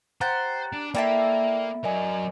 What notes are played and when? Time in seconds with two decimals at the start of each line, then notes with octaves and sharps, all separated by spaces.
0.21 G4 C5 F#5 G5 A#5 F#6 A6
0.73 D4
0.95 A#3 E4 A4 D5 E5 G5
1.84 F#3 A#4 D5 D#5 G#5